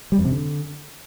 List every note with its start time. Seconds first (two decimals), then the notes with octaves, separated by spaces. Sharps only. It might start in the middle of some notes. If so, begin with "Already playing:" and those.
0.12 G3
0.18 F2
0.25 C3
0.32 D3